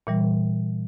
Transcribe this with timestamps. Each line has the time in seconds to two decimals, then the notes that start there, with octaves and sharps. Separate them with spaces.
0.07 A#2 E3 G3